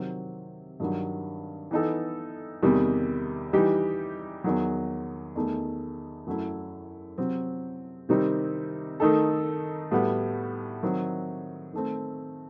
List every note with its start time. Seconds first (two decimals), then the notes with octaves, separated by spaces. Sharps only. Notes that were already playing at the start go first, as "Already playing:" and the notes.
Already playing: C3 D#3 F#3 C4
0.80 G2 D#3 F#3
1.71 E3 B3 D#4 A4
2.62 E2 C3 D#3 G3
3.53 E3 G3 D#4 G4
4.44 E2 D#3 F#3
5.36 E2 D#3 A3 D#4
6.27 F#2 F#3 A3 E4
7.18 C3 F#3 C4
8.09 C3 D#3 G3 C4 D#4
9.00 D#3 A3 D#4 A4
9.91 A2 G3 B3 F#4
10.83 D#3 F#3 C4
11.73 D#3 A3 C4